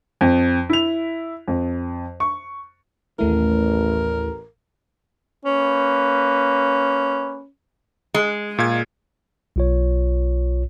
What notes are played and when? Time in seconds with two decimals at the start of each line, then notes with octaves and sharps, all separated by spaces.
0.21 F2
0.70 E4 F7
1.48 F2
2.20 C#6
3.19 A1 D#2 A3 E4 A#4
5.45 A#3 C#4 B4
8.14 G#3
8.58 A#2 F5 G#6
9.56 B1 F4 C#5